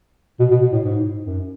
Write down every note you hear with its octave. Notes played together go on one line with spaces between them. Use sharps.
B2
B2
B2
A2
G#2
F#2